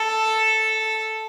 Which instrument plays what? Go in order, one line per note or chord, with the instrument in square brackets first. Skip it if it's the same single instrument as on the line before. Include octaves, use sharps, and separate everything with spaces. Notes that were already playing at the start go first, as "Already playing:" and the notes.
Already playing: [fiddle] A4